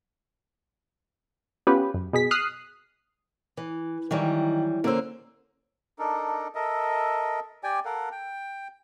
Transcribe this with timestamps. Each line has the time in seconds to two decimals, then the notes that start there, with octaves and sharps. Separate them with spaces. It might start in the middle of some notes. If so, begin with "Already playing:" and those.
1.67 B3 C#4 F4 G4 B4
1.94 F#2
2.13 B2 G#4 B6
2.31 D#6 F6 F#6 C7
3.57 E3
4.11 D#3 E3 F#3 G3
4.84 D3 A#3 C#4 C5 E6
5.99 D4 D#4 A4 A#4
6.55 A4 A#4 D#5 E5
7.64 G4 D5 G5 G#5
7.85 A4 A#4 F5 F#5
8.12 G5